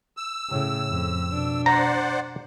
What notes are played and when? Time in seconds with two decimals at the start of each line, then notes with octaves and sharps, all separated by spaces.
0.17 E6
0.49 A2 C#3
0.91 F2
1.30 B2 D4
1.66 C5 D5 F#5 A#5